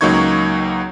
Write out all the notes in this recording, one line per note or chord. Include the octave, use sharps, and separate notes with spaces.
C#2 F#3 A#3 D#4 C#6 G#6